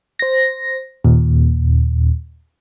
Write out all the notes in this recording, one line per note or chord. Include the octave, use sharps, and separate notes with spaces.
C5 A#6
D#2 A#2